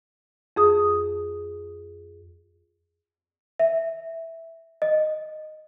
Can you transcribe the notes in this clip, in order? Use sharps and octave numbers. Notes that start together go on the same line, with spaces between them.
F2 G#4 D#6
E5
D#5